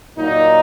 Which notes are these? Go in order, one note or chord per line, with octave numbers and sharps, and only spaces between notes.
A#2 F#3 A#3 D#4